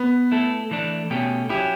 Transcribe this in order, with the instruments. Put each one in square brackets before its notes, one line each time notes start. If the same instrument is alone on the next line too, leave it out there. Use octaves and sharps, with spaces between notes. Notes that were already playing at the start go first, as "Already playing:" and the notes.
Already playing: [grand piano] B3
[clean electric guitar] A3 E4 A4
E3 A3 D4
B2 A3 C#4 G4
[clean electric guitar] F#3 C#4 E4 [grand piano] G4